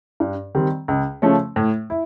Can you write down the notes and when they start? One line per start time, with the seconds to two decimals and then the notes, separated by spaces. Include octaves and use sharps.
0.20 G2
0.55 D#3 G3 C4
0.88 C#2
1.22 C#3 F3 A3 C#4
1.56 A2
1.90 E4